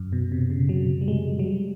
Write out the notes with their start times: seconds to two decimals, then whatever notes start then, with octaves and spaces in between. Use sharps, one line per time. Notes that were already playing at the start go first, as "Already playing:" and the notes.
Already playing: F#2
0.13 B2
0.32 C3
0.50 C#3
0.69 F#3
1.01 G3
1.08 G#3
1.39 F#3
1.46 G3